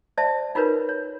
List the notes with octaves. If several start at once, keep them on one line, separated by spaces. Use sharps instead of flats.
C5 D5 E5 A5
D#4 F4 F#4 A#4 B4 C#5
C#5